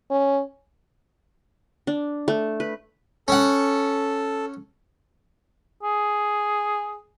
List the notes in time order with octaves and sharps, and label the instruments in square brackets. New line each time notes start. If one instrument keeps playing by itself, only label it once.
[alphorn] C#4
[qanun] D4
A3
B4
[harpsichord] C#4 F#5 [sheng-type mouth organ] A4
[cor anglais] G#4